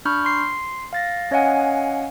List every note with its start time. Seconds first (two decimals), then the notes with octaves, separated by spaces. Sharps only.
0.05 D4 B5 C#6 F6 G6
0.25 C6 C7
0.93 F5 A6 A#6
1.31 C#4 C#5 D#5 F5 F#5 G#5